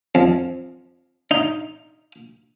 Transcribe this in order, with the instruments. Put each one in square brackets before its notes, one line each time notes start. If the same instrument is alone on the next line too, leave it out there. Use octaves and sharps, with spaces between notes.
[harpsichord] F2
D#4